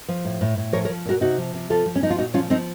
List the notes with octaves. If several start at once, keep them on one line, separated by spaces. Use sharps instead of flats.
F3
A2
A2
A2
F3 A#4 C#5
A#4 C#5
F3
A#2 F#4 A#4
C3 D#4 F#4
F3
C3
F3 F4 A4
F3
C#4
F3 D#4
F4
A#2 D#4 F#4
F3 C#4 F4
F3 C4 D#4